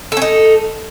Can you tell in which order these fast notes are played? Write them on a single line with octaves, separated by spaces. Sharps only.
A4 C#4 D#4